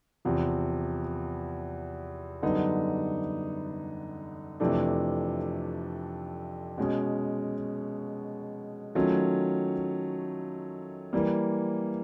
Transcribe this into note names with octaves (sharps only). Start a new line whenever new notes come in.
E2 C3 F3
F#2 D3 G3 B3 D#4
F2 C3 E3 A3 D4
B2 G#3 C#4
D#3 F#3 A3 C#4 F4
E3 G3 A#3